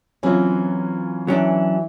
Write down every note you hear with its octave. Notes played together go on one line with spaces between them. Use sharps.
E3 F#3 C4 C#4 F4
E3 F#3 C#4 D4